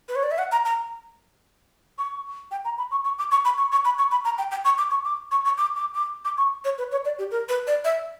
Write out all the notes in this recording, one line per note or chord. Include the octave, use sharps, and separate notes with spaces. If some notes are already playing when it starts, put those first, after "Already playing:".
B4
C#5
D5
E5
F#5
A#5
A#5
C#6
G5
A#5
B5
C#6
C#6
D6
C#6
B5
C#6
C#6
B5
C#6
B5
A#5
G5
G5
C#6
D6
C#6
D6
C#6
C#6
D6
D6
D6
D6
C#6
C#5
B4
C#5
D5
G4
A#4
B4
D5
E5